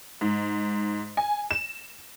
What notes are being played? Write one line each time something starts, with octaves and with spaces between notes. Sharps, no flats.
G#2
G#5
E7